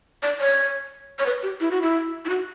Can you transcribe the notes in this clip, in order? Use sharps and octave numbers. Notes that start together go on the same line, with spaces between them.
D5
C#5
C#5
B4
G4
E4
F#4
E4
E4
F#4